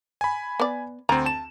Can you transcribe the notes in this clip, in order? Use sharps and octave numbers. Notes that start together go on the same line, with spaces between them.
G#5 B5
B3 D5
D2 C4 A#5
A5 E7